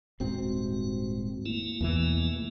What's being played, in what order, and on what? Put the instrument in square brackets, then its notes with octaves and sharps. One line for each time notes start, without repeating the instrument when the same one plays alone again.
[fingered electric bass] D#1 G#2 C4 [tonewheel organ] F#4
[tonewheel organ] A3 A#3 E4
[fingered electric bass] E2 B2 E3